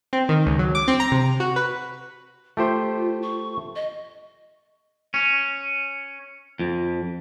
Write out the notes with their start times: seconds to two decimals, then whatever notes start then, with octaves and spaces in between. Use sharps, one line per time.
0.13 C4
0.29 D#3
0.46 C#2
0.59 F#3
0.75 D6
0.88 C4
1.00 A#5
1.12 C3
1.40 F#4
1.56 B4
2.57 A3 F4 G4 C5
3.22 C#6
3.75 D#5
5.14 C#4
6.59 F2